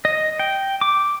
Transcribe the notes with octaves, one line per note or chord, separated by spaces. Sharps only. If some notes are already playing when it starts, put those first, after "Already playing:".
D#5
G5
D6